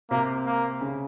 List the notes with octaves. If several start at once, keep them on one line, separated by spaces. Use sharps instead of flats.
C3 A#3
A#3
C#3